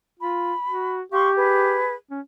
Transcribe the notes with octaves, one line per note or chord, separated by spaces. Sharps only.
F4 B5
F#4
G4 F5 C6 C#6
G#4 B4
C#4